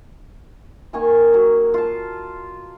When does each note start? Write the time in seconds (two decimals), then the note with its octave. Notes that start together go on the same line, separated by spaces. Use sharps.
0.93 D#3 A#3 G#5 C#6
1.34 F#3
1.74 F4 A5